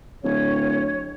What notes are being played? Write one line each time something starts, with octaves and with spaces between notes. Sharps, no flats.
D1 C#5